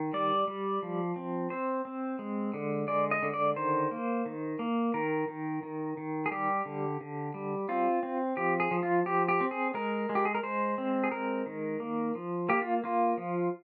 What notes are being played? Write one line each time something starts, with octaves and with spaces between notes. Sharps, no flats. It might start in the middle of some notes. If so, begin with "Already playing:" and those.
Already playing: D#3
G3 D5
G3
F3
C4
C4 C5
C4
G#3
D3
G#3 D5
D#5
D3
D5
D#3 C5
A#3
D#3
A#3
D#3 A#4
D#3
D#3
D#3
G#4
G3 G4
D3
D3
G3
C4 F4
C4
F3 G4
G#4
F3
F4
F3 G4
G4
C4
G#4
G#3 A#4
G#3
G4
G#4
A#4
G#3 C5
C4
G#4
G#3 A#4
D#3
A#3
F3
A#3 G4
F4
A#3 F4
F3